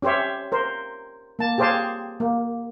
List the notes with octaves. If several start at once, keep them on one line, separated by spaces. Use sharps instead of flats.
C#4 G4 C5 C#5 E5
A#4 C5
A#3 A5
G4 G#4 C5 C#5 F5 A5
A#3